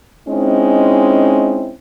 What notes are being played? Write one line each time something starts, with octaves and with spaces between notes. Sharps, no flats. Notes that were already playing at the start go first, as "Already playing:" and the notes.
G#3 C4 C#4 D#4 E4